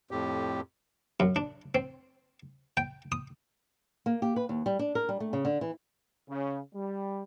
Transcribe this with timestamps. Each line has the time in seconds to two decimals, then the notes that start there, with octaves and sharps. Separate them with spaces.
0.11 F2 A2 G4
1.20 F#2
1.36 D4
1.75 C4
2.77 G5
3.12 D#6
4.06 A#3
4.22 G4
4.36 B4
4.49 D#2
4.66 G3
4.79 D4
4.95 A#4
5.09 G3
5.20 A3
5.33 C#3
5.45 D3
5.61 E3
6.29 C#3
6.74 G3